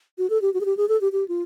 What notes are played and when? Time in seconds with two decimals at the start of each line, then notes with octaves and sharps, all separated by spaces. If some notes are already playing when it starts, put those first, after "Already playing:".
0.18 F#4
0.30 A4
0.42 G4
0.54 F#4
0.61 G#4
0.65 G4
0.77 G#4
0.88 A4
1.01 G4
1.12 G4
1.28 F4